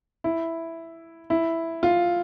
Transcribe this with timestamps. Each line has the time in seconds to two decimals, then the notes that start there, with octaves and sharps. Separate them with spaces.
0.24 E4
1.30 E4
1.83 F4